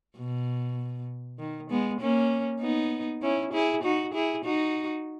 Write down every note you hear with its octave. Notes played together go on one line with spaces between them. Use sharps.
B2
D#3
G#3 B3
A#3 C#4
B3 D#4
C#4 E4
E4 G#4
D#4 F#4
E4 G#4
D#4 F#4